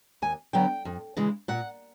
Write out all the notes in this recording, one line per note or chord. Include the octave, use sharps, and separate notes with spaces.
D#2 G#5
D3 F#3 B3 G5
F2
C#3 E3 G#3
A#2 F#5